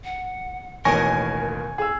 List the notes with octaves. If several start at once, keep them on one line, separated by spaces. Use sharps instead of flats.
F#5
A1 D#2 B2 A#4 G#5 C#6 A#6
G#4 E6